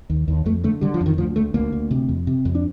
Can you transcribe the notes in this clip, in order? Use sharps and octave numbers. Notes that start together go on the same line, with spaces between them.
D#2
D#2
F2 A3
D3 A3
D3 G3
F3
F2
D#3
D2 F3
D2 A3
D2 A#3
D2
C3
F2
C3
F2
D4